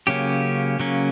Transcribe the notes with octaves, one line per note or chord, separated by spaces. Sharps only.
C#3 F#3 A#3 C#4 G4
C#3 F#3 A#3 C#4